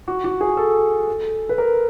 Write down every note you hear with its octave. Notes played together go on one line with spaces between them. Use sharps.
F#4
F#4
G#4
A4
A4
B4
A#4